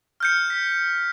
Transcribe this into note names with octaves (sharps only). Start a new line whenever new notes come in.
F6 G6 C#7
B6